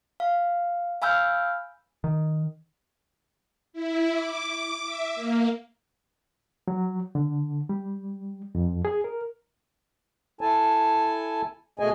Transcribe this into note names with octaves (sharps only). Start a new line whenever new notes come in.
F5
F5 G#5 B5 E6 F6 G6
D#3
E4
D6
E5
A#3
F#3
D3
G3
F2
G#4
A#4
E4 A4 G#5 A5
B2 A3 G#4 D#5 G#5